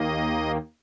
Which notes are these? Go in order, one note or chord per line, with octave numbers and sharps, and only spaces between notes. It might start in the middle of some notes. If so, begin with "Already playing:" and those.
Already playing: D#2 D#3 A#3 D#5